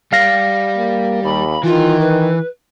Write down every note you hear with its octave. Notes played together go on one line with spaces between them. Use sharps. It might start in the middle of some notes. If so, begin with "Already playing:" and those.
G3 F5 A#6
A#3
D#2 B5
D#3 E3 F4
B4